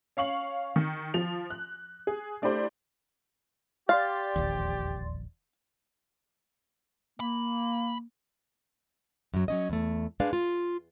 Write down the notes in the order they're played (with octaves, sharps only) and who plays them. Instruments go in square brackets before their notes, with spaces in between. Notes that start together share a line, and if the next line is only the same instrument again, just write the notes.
[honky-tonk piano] C#4 F5 C#6 F#7
D#3
F3 F7
F#6
G#4
A3 D4 E4 G4 C5
[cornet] G4 [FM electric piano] D5 C6 A6 [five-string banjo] F5
[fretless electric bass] E1 A#1 D#2
[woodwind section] A#3 [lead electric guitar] B5
[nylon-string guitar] F#2 F#3
F#3 C#4 D#5
E2 A3
G#3 D4 B4 D5 F5
F4